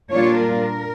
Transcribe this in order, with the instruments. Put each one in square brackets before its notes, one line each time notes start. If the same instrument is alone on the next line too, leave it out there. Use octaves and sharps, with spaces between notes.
[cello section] A#2 G3 D4 F4 C#5
A#4